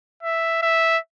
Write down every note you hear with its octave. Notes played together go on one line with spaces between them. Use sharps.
E5
E5